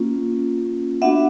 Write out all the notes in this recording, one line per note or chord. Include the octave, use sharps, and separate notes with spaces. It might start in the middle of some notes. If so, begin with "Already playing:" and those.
Already playing: A#3 C#4 F4
B3 D4 F#4 E5 F#5